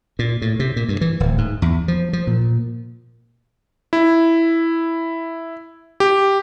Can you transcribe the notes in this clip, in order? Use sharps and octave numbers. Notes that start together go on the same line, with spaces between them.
A#2
A2
C3
A#2
G2
E3
D1
G#2
E2
F3
F3
A#2
E4
G4